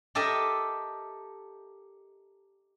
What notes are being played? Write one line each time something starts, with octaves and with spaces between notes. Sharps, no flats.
G4 A4 A#4 D#5 E5